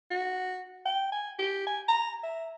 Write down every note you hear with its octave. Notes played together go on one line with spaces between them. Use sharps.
F#4
G5
G#5
G4
G#5
A#5
E5